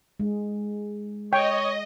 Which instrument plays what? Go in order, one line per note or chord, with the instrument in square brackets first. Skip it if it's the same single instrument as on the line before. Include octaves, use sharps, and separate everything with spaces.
[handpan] G#3
[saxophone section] C#5 [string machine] D#5 [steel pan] G5